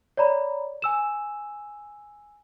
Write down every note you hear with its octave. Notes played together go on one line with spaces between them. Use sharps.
C#5 D5 A#5 B5
G#5 E6 E7